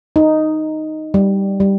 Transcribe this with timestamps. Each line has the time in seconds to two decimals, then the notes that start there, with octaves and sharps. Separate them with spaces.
0.16 D#4
1.14 G3
1.60 G3